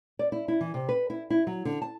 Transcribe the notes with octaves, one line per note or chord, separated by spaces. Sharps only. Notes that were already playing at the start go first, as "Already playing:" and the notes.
D5
E4
E4
E3
C3
B4
E4
E4
F#3
D3
A5